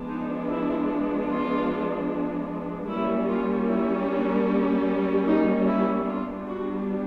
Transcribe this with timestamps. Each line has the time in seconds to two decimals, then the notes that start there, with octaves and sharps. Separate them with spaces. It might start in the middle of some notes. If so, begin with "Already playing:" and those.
Already playing: F3 G#3 B3 D4
0.09 D#4
0.48 E4
1.29 F4
2.88 G3 A#3 C#4 E4
3.29 F4
3.68 E4
4.09 D4
5.27 D#4
5.67 E4
6.08 G3 B3 D4 F4
6.47 F#4